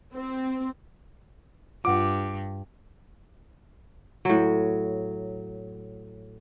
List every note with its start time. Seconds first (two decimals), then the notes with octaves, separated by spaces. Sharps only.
0.14 C4
1.85 G2 F4 F#5 D6
4.25 A2 F#3